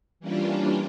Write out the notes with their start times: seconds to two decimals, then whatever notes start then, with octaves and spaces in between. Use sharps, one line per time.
0.20 E3 G3 A#3 C#4 D4 F4